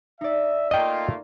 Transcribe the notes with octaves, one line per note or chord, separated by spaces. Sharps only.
D#4 D5 E5
A3 A#3 F4 D#5 G5